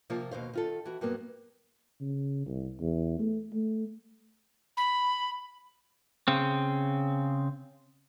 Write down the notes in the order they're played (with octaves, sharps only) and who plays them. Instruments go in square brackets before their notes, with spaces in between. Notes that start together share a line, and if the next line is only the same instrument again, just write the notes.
[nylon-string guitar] C3 F3 A#3 F4
D#2 B2 C5 F5
D#3 F4 A4
E3 F#4
G2 F#3 A#3 B3
[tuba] C#3
C2
E2
A3
A3
[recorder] B5
[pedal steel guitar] C#3 C4